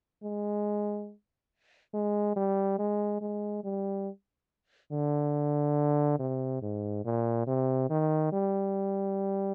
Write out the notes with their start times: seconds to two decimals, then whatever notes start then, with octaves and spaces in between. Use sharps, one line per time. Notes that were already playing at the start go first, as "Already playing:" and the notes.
0.24 G#3
1.94 G#3
2.36 G3
2.79 G#3
3.21 G#3
3.64 G3
4.92 D3
6.19 C3
6.62 G#2
7.05 A#2
7.47 C3
7.90 D#3
8.33 G3